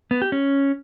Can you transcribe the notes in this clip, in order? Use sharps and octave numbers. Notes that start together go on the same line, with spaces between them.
B3
G4
C#4